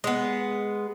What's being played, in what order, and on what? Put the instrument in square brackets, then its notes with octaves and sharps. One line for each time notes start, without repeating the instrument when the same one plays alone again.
[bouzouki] G#3 B3